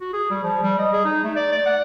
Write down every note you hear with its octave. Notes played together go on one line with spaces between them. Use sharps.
F#4
G#4
G3
F3
G3
D#5
G#4
D#4
A3
D5
D5
F#5